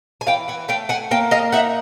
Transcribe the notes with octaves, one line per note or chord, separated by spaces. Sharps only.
G#5
E3 F5 G5
F#5 G#5
A3 F5 G5
F#5 G#5
A#3 F5 G5
D#5 F5
D#4 E5 F#5